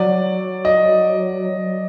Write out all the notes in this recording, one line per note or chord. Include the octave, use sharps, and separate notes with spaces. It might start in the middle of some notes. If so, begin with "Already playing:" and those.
Already playing: F#3 D5
D#5